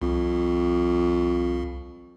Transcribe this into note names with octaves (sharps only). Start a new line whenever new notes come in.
C2 F2